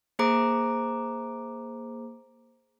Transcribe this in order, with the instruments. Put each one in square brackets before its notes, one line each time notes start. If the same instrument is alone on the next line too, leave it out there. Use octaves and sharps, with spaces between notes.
[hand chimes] A#3 G#4 C5 A#5 D6 D7